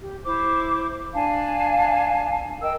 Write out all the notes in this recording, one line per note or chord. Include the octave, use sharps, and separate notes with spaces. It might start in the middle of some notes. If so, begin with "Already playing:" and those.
G4
E4 C5 D6
D4 F5 G#5 A5
A#4 D#5 G5 E6